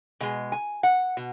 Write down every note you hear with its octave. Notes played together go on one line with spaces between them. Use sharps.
B2 G#3 G#5
G#5
F#5
B2